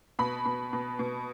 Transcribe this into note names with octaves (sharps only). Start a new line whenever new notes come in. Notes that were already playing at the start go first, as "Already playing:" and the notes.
B2 B5
B2
B2
B2